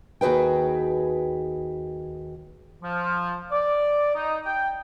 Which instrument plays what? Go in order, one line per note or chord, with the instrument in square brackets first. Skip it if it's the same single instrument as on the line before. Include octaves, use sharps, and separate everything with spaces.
[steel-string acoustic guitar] D#2 F#4 G#4 B4 G5
[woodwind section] F3
D5
D#4
G5